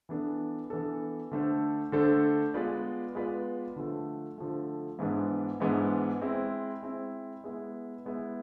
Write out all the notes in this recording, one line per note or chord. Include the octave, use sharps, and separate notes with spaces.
E3 B3 D4 A4
E3 B3 D4 A4
D3 A3 D4 A4 C5
D3 A3 D4 A4 C5
G#3 B3 F4 B4 D5
G#3 B3 F4 B4 D5
D3 F3 A3
D3 F3 A3
G#2 E3 G#3 B3 D4
G#2 E3 G#3 B3 D4
G#3 C4 E4
G#3 C4 E4
G#3 B3 E4
G#3 B3 E4